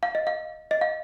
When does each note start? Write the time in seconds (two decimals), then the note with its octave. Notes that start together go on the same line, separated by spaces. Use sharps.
0.03 F5
0.15 D#5
0.27 F5
0.71 D#5
0.81 F5